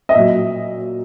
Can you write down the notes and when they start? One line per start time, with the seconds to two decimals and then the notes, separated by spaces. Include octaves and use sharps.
0.09 D#5
0.15 A#2 F#3 E5